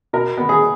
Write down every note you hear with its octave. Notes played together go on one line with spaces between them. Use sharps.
B2 A#4
B3
G#4